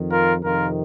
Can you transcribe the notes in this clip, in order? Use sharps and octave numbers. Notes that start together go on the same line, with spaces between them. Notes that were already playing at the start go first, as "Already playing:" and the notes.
Already playing: F2 D#3
F4 A#4
F2 C3 D#3 F4 A#4